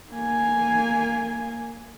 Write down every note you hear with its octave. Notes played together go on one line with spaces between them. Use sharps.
A#3 G#5